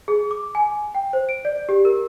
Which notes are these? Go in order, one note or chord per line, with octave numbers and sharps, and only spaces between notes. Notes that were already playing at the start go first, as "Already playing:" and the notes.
G#4
D6
G#5
G5
C5
D7
D5
G4
A#4